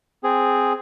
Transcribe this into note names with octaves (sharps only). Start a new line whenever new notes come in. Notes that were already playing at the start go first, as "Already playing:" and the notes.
C4 G#4